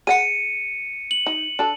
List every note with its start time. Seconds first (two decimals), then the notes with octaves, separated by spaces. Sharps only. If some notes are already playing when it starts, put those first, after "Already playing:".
0.07 G#4 F#5 C#7 D#7
1.11 F#7
1.26 D#4
1.59 D4 A4